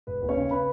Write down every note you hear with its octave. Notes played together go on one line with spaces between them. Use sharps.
E1 B4
D#2
C#4 C#5
C#3
C#3 B4 B5